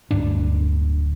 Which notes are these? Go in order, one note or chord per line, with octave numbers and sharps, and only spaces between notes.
D1 D2 G2 D4